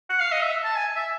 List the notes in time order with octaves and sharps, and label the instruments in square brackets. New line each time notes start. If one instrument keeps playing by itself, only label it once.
[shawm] F#5
F5
D#5
E5
A5
G#5
E5